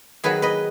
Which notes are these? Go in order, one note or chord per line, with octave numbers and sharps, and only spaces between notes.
D#3 F#3 B3 G#4 B4
B4 D#5